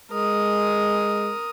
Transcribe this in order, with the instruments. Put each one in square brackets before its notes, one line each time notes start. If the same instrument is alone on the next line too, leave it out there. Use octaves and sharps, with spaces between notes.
[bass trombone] G#3 [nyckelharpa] A#4 D#6